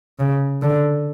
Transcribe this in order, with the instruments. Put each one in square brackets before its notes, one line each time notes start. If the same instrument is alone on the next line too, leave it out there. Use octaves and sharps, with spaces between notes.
[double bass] C#3
D3